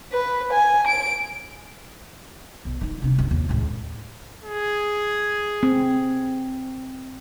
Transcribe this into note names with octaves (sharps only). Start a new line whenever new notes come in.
B4
G#5
D7
B1
E3 D#4
C3 D4
B1 F#2
D#2
C#2 A2
G#4
C4